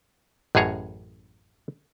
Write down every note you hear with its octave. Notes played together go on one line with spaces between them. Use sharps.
A1 F#2 A2 G#4 C#5 A#5